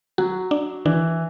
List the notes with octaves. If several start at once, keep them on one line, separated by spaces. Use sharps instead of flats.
F#3 F#4
D4
E3 D4